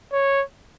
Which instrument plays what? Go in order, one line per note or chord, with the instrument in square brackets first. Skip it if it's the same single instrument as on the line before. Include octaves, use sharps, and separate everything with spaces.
[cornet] C#5